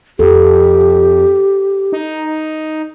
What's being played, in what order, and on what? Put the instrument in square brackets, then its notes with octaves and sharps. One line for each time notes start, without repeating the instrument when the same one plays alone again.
[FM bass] F2 [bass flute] G4 [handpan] A4
[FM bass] D#4